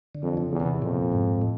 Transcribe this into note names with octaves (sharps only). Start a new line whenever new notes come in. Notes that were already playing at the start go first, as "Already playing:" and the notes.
D3
F2
C#3
E2
C3
F2 A#2
G#2
A2